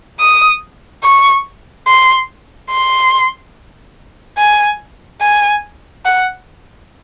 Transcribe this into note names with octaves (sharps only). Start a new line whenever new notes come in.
D#6
C#6
C6
C6
G#5
G#5
F#5